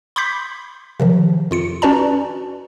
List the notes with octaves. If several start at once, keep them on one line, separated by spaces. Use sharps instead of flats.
B5 C6 D6 G6 B6
C3 D#3 F3
F2 F4 C#7
C#4 F#4 B4 D5 A5 A#5